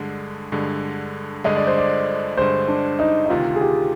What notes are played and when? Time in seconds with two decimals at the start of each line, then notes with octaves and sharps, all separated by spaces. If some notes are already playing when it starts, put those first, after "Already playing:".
Already playing: G2 D3 G#3
0.52 G2 D3 G#3
1.44 G2 D3 G#3 D#5
1.56 D5
1.67 C5
1.78 D5
2.37 G2 D3 G#3 C5
2.68 D4
2.99 D#4
3.26 D#4
3.30 D2 C3 D#3 F4
3.56 G#4
3.61 G4